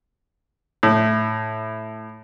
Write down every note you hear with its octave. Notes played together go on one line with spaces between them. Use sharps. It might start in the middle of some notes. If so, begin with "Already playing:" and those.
A2